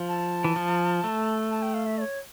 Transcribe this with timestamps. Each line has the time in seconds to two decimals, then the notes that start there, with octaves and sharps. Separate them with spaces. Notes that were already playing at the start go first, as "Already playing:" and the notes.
Already playing: F3
0.09 A5
0.44 E3
0.56 F3
1.04 A3
1.51 A5
1.62 G5
1.74 F5
1.86 E5
1.98 D5
2.01 C#5